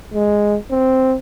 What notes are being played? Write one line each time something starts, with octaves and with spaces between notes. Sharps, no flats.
G#3
C4